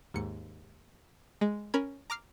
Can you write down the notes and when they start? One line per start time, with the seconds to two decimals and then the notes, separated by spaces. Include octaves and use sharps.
0.14 D#2 G#2 C#7
1.41 G#3
1.74 C#4 A#4 B5 G#6
2.10 A#5 D6 F6 C7